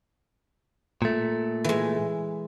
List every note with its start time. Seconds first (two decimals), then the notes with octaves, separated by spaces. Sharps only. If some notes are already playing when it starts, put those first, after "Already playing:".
1.02 A#2 A3
1.64 E3 G#3